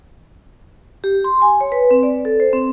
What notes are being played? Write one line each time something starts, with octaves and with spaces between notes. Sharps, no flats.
G4
C6
G#5
C#5
B4
C4
D5
A4
C5
C4